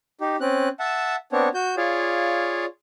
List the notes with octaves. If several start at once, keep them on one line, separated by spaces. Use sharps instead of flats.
D#4 G4
C4 C#4 F#6
E5 F#5 A5
B3 C4 D4 C#5
F#4 G6
F4 G#4 C#5 D5 F5